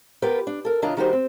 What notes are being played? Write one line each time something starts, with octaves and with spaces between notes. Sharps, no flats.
B3 F4 G4 A#4 B4 G5
D4
A4 A#4
C#3 E3 D4 F4 D#5 A#5
D#3 G3 D#4 F#4 G4 C5
C4